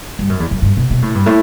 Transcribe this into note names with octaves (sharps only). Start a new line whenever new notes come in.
G2
F#2
E2
F#2
G2
B2
B2
A2
G2
A2